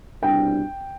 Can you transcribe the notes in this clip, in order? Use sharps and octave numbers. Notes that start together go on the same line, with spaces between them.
C2 B2 G3 D4 G5